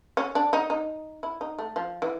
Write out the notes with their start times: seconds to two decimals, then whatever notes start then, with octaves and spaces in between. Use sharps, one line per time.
0.17 C#4
0.35 D4
0.53 D#4
0.70 D#4
1.23 E4
1.41 D#4
1.59 A3
1.76 F3
2.02 E3